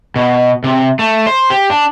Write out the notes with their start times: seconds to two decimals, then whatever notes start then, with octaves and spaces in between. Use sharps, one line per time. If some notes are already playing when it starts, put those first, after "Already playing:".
0.16 B2
0.64 C3
0.99 A3
1.27 C5
1.50 G4
1.70 D4